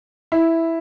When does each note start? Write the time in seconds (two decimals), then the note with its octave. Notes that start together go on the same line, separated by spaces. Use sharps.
0.32 E4